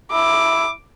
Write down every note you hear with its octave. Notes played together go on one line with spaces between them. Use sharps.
E4 D6